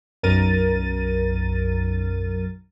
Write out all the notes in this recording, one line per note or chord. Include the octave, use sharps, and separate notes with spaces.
B1 F#2 A#4 A6 D#7